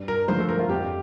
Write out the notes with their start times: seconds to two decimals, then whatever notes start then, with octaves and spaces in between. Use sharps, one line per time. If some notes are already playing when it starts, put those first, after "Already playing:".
Already playing: G2
0.08 A#4
0.28 D3 F3 A3 C5
0.40 A4
0.49 A#4
0.59 F4
0.69 F2 G4